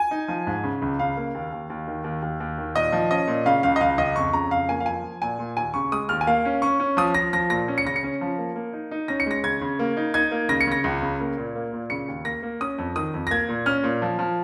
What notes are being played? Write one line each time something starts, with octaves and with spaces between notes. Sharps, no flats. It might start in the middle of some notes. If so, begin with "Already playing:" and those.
Already playing: G#5
D#4
F3
G#2
C#3
C#2
C#3 F5
A#3
D#2
D#2
D#2
D#3
D#2
D#2
D#2
D#3
A#2 D#5
F3
C#4 D#5
A#2
C#3 F5
C#2 F5
D#5
C#2 F5
C#2 D#5
F2 C#6
C#3 A#5
F2 F5
A#3 G#5
F5
F3 G#5
F3
A#2 G#5
A#2
D#2 G#5
C#3 C#6
G#3 D#6
D#2 F6
G#5
A#3 F5
C#4
C#4 C#6
C#4
F3 D#6
F3 A#6
F3 A#6
A#2 A#6
C#4
C#7
C#3 A#6
C#7
C#4
F3
A#3
A#3
D#4
D#4
C#4 A#6
C#7
G#3 A#6
C#3 G#6
C#3
A#3
D#4
D#4 G#6
A#3
C#3 A#6
C#7
C#3 A#6
C#2
C#3
A#3
A#2
A#3
A#2
C#3 C#7
D#2
A#3 A#6
A#3
C#4 D#6
F2
D#3 D#6
F2
A#6
A#3 G#6
A#2
C#4 F6
A#2
F3
F3